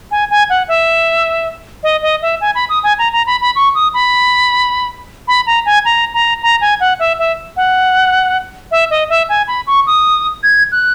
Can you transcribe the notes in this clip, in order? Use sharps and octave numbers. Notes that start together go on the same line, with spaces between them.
G#5
G#5
F#5
E5
D#5
D#5
E5
G#5
B5
D#6
G#5
A#5
A#5
B5
B5
C#6
D#6
B5
B5
A#5
G#5
A#5
A#5
A#5
G#5
F#5
E5
E5
F#5
E5
D#5
E5
G#5
B5
C#6
D#6
G#6
F#6